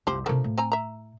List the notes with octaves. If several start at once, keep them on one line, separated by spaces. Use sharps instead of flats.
C2 F#2 F3 G4 C5
C3 F3 A3 A#3 D4
A2
C4 G#5 A#5
E5 A#5